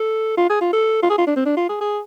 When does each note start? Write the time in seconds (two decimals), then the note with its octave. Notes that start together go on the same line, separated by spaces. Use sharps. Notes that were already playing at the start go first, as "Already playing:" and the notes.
Already playing: A4
0.37 F4
0.50 G#4
0.61 F4
0.73 A4
1.03 F4
1.10 G#4
1.18 F4
1.27 D4
1.36 C4
1.46 D4
1.57 F4
1.69 G#4
1.81 G#4